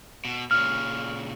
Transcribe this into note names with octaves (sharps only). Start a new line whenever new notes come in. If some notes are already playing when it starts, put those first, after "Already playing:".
B2
A#2 C#3 F6